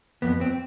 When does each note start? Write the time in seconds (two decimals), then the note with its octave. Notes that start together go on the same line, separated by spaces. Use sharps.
0.22 F2 B3
0.41 C4